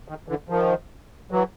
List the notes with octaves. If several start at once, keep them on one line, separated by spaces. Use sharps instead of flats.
D#3
D3 E3
D#3 F3
E3 F#3